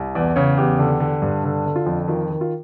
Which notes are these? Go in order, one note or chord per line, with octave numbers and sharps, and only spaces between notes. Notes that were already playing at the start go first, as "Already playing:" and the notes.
Already playing: C2
E2 D5
C#3 C#5
E2 G4
D3
D3
G2
D3
D3
F4
F2
D#3 F4
D#3
F4